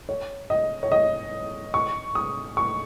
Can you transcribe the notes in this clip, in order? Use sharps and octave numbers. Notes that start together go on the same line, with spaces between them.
C#5
D#5
C#5
D#5
C#6
D#6
C#6